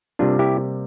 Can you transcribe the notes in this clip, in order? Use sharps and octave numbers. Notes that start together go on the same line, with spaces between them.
C3 G3 A#3 D4 F4
E4 G4